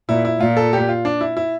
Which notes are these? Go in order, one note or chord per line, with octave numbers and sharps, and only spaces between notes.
A#2 E4
E4
A#2 F4
A4
G4
F4
D4
E4
E4